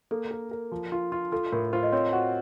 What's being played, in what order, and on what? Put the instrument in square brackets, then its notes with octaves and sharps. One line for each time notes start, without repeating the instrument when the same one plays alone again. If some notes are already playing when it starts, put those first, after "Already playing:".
[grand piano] A#3 [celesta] A4
[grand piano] A#4
A#4
F3
F4
F4
[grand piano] F4 [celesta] A4
[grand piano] A2 [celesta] A#4
[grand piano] F4 [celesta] C5
[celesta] D#5
[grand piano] C4 [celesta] C#5
[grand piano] F#4